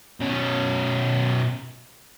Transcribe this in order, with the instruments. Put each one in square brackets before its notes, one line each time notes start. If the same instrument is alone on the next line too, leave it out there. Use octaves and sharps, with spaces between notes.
[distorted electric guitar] B2 C#4